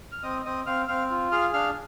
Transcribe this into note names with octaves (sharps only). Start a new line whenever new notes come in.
F6
C4 D#5 D#6
C4 D#5 D#6
C4 F5 F6
C4 F5 F6
F4
G#4 F5 F6
D4 F5 F6